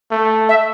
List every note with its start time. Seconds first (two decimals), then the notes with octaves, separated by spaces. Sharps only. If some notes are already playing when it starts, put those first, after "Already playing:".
0.11 A3
0.49 E5